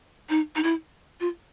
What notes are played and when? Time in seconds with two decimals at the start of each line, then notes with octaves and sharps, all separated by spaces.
0.29 D#4
0.56 D#4
0.63 E4
1.20 F4